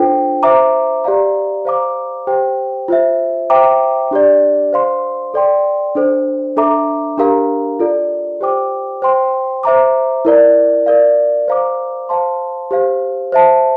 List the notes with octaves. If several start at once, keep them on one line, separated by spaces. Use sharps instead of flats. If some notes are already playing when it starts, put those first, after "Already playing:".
Already playing: D4 F4 A4 C5 G5
C5 E5 A#5 D6
G4 D5 F5 A#5
C5 F5 A#5 D6
G4 C5 G5
F4 C5 E5
C5 E5 G5 A#5 D6
D4 G4 D5
C5 F5 C6
A4 D5 G5 C6
D4 A4 C5
D4 A4 E5 A#5 D6
D4 G4 A#4 F5 A#5
F4 A4 D5
G4 C5 G5 D6
C5 G5 C6
C5 E5 A#5 D6
E4 A#4 D5
A#4 D5 F5
C5 F5 A#5 D6
C5 F5 A5 C6
G4 C5 F5
C5 E5 A5